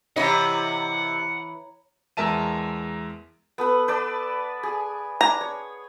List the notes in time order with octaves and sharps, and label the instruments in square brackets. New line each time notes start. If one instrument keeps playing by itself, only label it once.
[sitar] C3 D#5 [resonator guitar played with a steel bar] E3 E4 [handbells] C#5 A#5 [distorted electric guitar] F#5
[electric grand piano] E2 G#3 A#4 E5 A5 D#7
[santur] B3 A4 B4
B4 D5 A5
G#4
[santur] D4 [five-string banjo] A#5
[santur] C#5